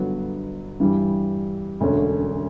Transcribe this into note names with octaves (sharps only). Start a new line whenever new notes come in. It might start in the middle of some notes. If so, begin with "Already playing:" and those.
Already playing: G1 G2 D3 F#3 B3
G2 E3 G3
E1 D2 D3 A3 C#4